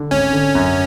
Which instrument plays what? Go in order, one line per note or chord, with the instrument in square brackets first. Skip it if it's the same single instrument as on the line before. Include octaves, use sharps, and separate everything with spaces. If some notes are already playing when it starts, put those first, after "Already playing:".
Already playing: [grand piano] D3
[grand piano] G#1 [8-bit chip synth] C#4
[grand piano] D3
F#2